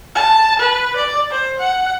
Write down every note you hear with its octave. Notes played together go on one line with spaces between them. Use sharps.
A5
B4
D5
C5
F#5